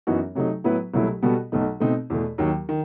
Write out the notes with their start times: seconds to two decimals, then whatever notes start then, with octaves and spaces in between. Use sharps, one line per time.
0.07 F#2 E3 B3 D#4 F#4
0.35 C3 F#3 A3 D#4
0.64 A2 F#3 B3 E4 B4
0.94 C2 B2 F#3 A3 E4
1.22 B2 G3 B3 F#4 A4
1.52 B1 B2 A3 D#4
1.80 B2 A3 C4 D#4
2.10 E2 B2 A3
2.38 D#2 D#3 F#3
2.69 D#3